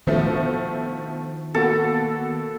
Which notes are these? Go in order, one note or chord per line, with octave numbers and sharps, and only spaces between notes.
B2 D#3 F3 A3 C#4 D4
B2 A#3 F#4 A4